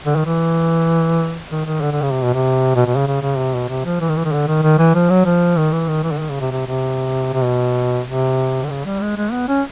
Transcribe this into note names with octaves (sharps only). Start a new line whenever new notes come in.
D3
D#3
E3
D#3
D#3
D3
D3
C#3
C3
B2
C3
B2
B2
C#3
C#3
C#3
C3
B2
C3
F3
E3
D#3
E3
D#3
D3
D#3
D#3
E3
F3
F#3
F3
D#3
E3
D#3
E3
D3
D#3
C#3
C3
C3
C3
C3
B2
C3
D3
C#3
G3
G#3
G#3
B3
C#4